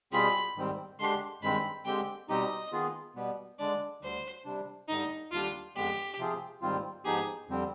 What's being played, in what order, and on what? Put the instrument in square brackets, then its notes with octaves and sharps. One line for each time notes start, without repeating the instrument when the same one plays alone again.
[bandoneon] B2 G3 C4 F4 G#4 [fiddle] B5
[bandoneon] G#2 D#3 G3 C4
[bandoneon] D3 G#3 D4 G4 [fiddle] C6
[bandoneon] G2 D#3 G#3 C4 [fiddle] B5
[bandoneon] D3 G#3 C4 G4 [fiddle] G5
[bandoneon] B2 G3 C4 D#4 G4 [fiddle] D#5
[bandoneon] D#3 B3 F4 G#4
B2 G3 B3
[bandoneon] D3 G#3 D4 [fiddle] D5
[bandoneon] D2 D3 G3 [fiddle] C5
[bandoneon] C3 G3 D4
[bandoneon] G2 D3 G3 [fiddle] D#4
[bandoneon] D#2 D3 G3 D4 G4 [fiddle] F4
[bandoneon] F2 D3 G#3 B3 [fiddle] G4
[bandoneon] C3 F3 C4 F4 G#4
G#2 D#3 G3 C4 F4
[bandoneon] G#2 F3 B3 D#4 G4 [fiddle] G#4
[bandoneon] F2 D3 G3 C4